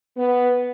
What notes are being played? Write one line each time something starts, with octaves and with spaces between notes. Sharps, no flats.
B3